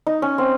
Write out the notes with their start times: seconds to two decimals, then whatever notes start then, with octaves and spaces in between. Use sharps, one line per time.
0.07 D#4
0.22 C#4
0.38 C4